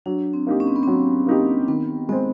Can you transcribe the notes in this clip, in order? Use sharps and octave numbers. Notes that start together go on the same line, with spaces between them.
F#3 D4
C4
A#3 D#4 G4
C#4
C4
B3
F#3 C4
A#3 D#4 G4
D#3 B3
G#3 B3 C4